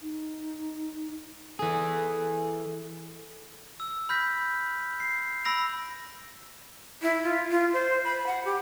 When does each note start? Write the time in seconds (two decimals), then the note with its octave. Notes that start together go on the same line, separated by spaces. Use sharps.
0.01 D#4
1.59 E3 G#4 A4
3.80 E6
4.09 B5 F6 G6 A#6 B6
5.00 C7
5.45 B5 E6 A#6 D7 F7
7.02 E4
7.24 F4
7.51 F4
7.73 C5
8.04 B5
8.27 F#5
8.45 G4